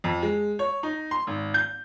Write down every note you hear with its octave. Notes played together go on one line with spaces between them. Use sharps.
F2
G#3
C#5
D#4
C6
G#1
G6